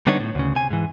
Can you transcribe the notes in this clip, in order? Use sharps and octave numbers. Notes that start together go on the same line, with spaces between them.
D3 G3 B3 D4 D#4 C#5
A2
D2 C#3
C3 G#5
G#2 E3